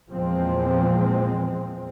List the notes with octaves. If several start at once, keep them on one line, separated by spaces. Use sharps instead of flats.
E2 A#2 F3 G#3 C4